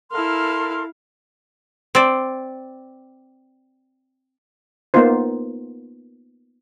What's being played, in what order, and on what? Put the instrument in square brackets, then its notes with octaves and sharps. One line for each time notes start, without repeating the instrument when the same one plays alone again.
[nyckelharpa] E4 F5 [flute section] A4 A#4 C6
[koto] C4 C5 D5
[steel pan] A#3 B3 D#4 F4 C5